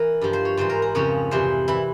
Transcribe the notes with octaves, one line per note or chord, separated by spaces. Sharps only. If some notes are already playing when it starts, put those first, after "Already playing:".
Already playing: E3 A#4
G2 F3
C5
C#5
G#2 E3 C5
A#4
A#4
F2 C#3 F3 C#5
F2 C3 E3 C5
E3 E4